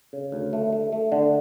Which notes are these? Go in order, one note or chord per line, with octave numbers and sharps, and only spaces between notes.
C#3
D2
A3
A3
A3
D3